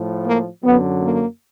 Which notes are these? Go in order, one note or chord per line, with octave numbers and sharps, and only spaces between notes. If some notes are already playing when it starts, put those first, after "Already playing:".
Already playing: A2 F3
A#3
F#2 D3 F#3 B3
A#3